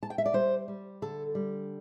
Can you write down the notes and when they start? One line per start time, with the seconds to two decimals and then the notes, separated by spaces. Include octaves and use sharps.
0.03 A5
0.10 G5
0.18 E5
0.26 D5
0.33 G3 C5
0.68 G3
1.02 D3 A4
1.35 G3